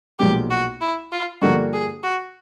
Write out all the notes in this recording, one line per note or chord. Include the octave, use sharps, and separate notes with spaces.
B1 A#2 F3 G#3 G4
F#4
E4
F4
G2 D3 F3 A#3 D4 F#4
G#4
F#4